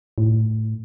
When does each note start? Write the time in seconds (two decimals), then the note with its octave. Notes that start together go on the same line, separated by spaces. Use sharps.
0.18 A2